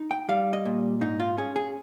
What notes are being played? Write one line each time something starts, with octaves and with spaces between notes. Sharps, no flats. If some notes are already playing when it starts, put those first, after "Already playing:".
Already playing: D#4
G5
G3 F5
D#5
A#2
G#2 D#4
F4
C#4 G#4
G#4